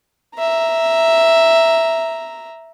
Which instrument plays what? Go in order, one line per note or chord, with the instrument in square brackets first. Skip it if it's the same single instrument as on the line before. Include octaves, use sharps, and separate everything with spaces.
[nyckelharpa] E5 A#5